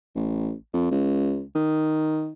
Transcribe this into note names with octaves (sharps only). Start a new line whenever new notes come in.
A1
F2
C#2
D#3